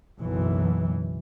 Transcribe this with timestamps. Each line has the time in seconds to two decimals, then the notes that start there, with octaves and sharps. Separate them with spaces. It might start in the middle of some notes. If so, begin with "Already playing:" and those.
0.18 F#1 B1 E3